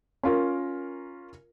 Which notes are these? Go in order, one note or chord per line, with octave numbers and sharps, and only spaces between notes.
C#4 F4 A#4